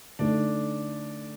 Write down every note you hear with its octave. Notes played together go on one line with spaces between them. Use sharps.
D3 A3 D4 D#4